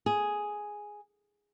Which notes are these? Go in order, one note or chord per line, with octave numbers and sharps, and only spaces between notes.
G#4